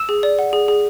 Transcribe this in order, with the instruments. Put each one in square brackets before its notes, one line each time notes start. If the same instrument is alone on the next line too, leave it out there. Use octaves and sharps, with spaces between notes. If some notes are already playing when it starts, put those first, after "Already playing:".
Already playing: [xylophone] E6 E7
G#4
D5
F#5
G#4
G#4